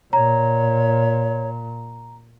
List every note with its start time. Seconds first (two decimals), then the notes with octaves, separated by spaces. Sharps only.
0.13 A#2 C#5 A#5